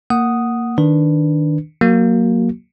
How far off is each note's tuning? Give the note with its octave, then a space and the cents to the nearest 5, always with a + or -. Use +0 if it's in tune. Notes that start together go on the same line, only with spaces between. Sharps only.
A#3 -10 F#5 +0 D#6 +0
D#3 +0 D4 +0 B4 +0
F#3 -15 A#3 +0 F#4 +25